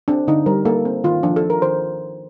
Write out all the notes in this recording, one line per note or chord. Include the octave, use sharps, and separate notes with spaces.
C4 D4
D3 D#4
G3 A#4
A#3 A4
C4
D#3 F4
F3 D4
A4
F3
A#4
D#3 C5